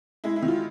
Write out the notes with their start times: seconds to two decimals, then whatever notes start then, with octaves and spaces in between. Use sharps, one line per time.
0.24 G#3 E4
0.36 E4
0.42 D#3
0.48 F4